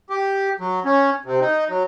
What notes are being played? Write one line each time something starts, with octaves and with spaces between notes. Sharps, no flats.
G4
F#3
C#4
C3
D#4
F#3